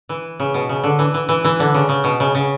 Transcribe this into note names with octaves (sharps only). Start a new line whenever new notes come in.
E3
C#3
B2
C#3
D3
E3
E3
E3
E3
D3
C#3
C#3
B2
C#3
C#3